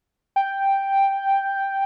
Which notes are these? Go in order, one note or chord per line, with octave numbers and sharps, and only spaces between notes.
G5